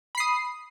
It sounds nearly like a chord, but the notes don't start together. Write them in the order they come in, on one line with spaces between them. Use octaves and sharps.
B5 C7 D#6